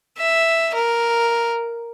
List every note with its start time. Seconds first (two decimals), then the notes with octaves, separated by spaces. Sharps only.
0.18 E5
0.75 A#4